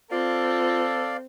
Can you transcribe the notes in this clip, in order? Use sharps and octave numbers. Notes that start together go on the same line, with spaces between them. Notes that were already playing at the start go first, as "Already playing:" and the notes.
C4 F4 A4 D5 F5